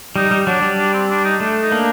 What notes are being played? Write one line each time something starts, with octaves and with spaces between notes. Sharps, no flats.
G3 D#4
G3
F#3 D4
G3
D4
C4
D4
D#4
A3 D4
D#4
A#3 D4